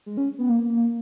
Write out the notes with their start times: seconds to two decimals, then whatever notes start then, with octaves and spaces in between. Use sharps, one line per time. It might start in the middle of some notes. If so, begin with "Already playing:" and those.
0.06 G#3
0.17 C#4
0.38 B3
0.49 A#3